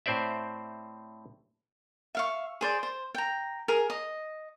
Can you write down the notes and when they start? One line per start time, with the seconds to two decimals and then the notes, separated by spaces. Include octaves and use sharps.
0.06 A2 C4 C5 D5 E5
2.15 E5 F5 C#6
2.61 G#4 C5 D5
2.83 C5
3.15 G5 A#5
3.68 G#4 A#4
3.90 D#5